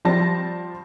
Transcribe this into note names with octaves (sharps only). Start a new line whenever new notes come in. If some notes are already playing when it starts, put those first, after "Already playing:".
F3 G3 C4 A5 A#6